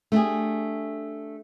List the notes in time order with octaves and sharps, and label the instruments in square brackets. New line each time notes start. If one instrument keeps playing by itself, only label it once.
[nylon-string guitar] A3 D4 G4 G#4